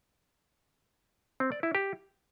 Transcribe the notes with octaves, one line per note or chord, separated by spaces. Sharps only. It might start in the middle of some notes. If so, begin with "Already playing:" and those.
C4
D5
E4
G4